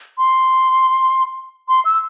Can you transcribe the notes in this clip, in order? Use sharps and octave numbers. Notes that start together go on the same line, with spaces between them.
C6
C6
E6